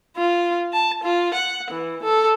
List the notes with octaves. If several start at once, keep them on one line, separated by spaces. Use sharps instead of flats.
F4
A5
F4
F#5
E3
A4